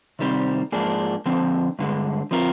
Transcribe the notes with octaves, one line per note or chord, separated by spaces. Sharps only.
C3 D#3 G3 C4 G4
G#2 F3 A#3 D4 G#4
D3 F3 C4
G2 D3 G#3
F3 C4 F4 A#4